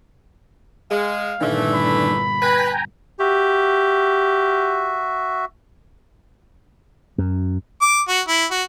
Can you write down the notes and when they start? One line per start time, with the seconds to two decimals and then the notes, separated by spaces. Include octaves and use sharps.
0.91 G#3 F5
1.41 G1 A#2 D#3 E3 A3 D4
1.74 B5
2.42 B4 G5 G#5 A#5
3.20 F#4 G4 E5
7.18 F#2
7.82 D6
8.08 F#4
8.28 E4
8.51 F#4